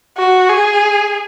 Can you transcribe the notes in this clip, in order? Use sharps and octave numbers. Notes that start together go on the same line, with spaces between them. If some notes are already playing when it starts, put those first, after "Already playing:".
F#4
G#4